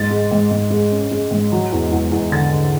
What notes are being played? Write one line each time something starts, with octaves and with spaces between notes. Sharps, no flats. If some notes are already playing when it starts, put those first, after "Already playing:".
Already playing: G#2 A6
G#3
G#2
G#2
G#3
C#4
G#3
G#2
F#3
E2
E2
E2
D3 A6
D3